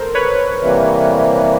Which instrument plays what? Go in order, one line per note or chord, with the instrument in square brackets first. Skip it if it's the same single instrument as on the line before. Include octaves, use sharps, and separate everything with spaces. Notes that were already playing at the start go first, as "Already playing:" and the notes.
Already playing: [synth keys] A4 A#4 C5
B4 C#5
[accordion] C3 E3 G3 A#3